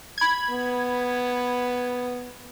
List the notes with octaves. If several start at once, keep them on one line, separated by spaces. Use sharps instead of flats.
B5 G#6
B3